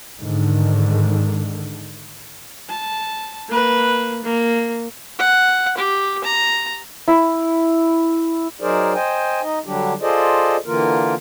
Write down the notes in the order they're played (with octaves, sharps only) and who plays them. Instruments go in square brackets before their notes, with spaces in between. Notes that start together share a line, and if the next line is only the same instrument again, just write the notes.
[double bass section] G#2 D3 D#3
[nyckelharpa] A5
A#3 B4
A#3
F#5
G4
A#5
[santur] E4
[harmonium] F#3 D#4 G#4 A#4 C5 D5
C5 D#5 G5 G#5
D#4 D#5
D3 F#3 G3 D4 G4
F4 G#4 A4 C5 D5 D#5
D3 E3 A#3 F4 A#4